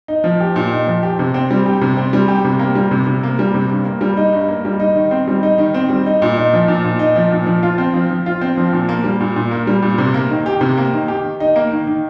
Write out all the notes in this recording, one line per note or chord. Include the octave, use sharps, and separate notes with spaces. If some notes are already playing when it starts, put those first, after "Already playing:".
D#4
F3
G4
A#2
D#4
F3
G4
C3
C4
G3
G4
C3
C4
G3
G4
C3
A#3
G3
C3
C3
A#3
G3
C3
G2
A#3
G3
D#4
G2
A#3
G3
D#4
D#3
C4
G3
D#4
D#3
C4
G3
D#4
A#2
D#4
F3
A#2
A#2
D#4
F3
A#2
F3
F4
C4
F3
F3
F4
C4
F3
A#2
A#3
G3
A#2
A#2
A#3
G3
A#2
C3
A#3
D#3
G4
C3
A#3
D#3
G4
D#3
D#4
A#3
D#3
D#3